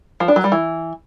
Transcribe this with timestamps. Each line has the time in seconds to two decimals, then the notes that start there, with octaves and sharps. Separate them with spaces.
0.20 F3
0.28 D4
0.36 F#3
0.44 G3
0.52 E3